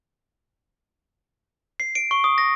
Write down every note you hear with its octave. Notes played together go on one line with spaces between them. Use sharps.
C7
D7
C#6
D#6
A#6